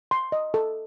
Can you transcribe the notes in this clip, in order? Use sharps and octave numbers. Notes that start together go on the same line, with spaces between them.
C6
D#5
A4